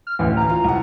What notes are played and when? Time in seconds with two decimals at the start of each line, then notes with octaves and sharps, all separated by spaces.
0.07 F6
0.19 A1 D2 E3
0.37 A#5
0.49 F4
0.64 C2 F#5